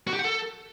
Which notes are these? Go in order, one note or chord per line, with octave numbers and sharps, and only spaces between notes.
F#4
G4
F#5
A4